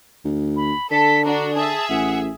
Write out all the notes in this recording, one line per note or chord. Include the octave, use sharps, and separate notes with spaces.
D2
B5
D3 A4 B6
D4 F#4 A#5
G#4 E5 A5
A1 F#5